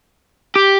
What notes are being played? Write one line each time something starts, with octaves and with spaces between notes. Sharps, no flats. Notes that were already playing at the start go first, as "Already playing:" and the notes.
G4